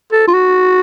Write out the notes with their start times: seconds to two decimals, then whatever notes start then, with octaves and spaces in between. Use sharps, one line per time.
0.12 A4
0.27 F4
0.34 F#4